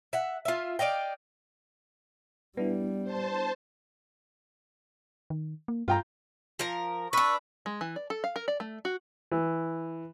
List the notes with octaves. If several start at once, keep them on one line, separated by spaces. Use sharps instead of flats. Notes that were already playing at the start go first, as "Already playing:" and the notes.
E5 F#5
F4 E5
D5 D#5 F5 G5
G3 B3 D4 E4
C5 A5
D#3
A#3
G2 F4 G5 A#5
F3 A#4
D4 B4 C#6 E6 F#6
G#3
E3
D5
A4
F5
A#4
D5
A3
F#4
E3